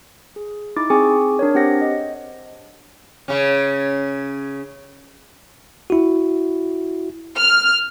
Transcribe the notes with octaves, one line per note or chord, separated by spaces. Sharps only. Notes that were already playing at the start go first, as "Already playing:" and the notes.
G#4
D#4 E4 D6 A6
C4 G#4 G#5 C#6 D6
D4 A#4 C#5
C4 G4 C5 F#5 A#6
D#5
C#3 C#4
E4 F#4
F6